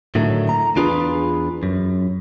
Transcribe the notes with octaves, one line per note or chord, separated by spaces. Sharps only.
A2 D3 D#3 F#3 A3
A#5
E2 D4 F4 G#4 B4
F#2